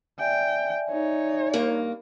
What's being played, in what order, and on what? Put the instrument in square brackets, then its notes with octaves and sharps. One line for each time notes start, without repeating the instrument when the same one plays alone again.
[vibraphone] D5 E5 G#5 [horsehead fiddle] G5
[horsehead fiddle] D#4 C#5
[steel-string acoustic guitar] G2 A#3